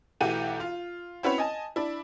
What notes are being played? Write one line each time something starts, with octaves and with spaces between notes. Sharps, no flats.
B1 E3 A3 F#4 G4 D#7
F4
C4 C#4 E4 F#4 B4 C#5
D#5 G#5 A5
D4 E4